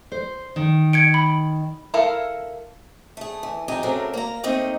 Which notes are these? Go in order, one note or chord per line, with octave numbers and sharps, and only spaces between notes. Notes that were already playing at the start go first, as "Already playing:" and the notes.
C5
D#3
G#6 C#7 D7
B5
E4 A4 A#4 E5 F5
A3 G#4
E3
F2 D#4 G4 D#5 G#5 A#5
C#3 F#3 A3 C4 D4 A#4
A#3 A#5
A3 A#3 C4 D#4 D#5